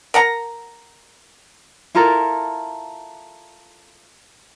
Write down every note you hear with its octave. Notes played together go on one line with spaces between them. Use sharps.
A#4 F#5 A#5
E4 F4 A4 A#4